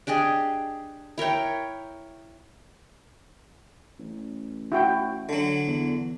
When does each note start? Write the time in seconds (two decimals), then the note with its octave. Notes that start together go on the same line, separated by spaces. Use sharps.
0.07 D4 G4 G#4 D#5
1.18 E4 A#4 C#5 G5
3.99 A1
4.72 E4 F#4 G5
5.29 D3 F#3
5.67 E2